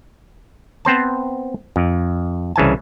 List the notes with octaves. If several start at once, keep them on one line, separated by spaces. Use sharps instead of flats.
B3 C4 C5 A5
F2
C2 C#3 E3 G#5 A5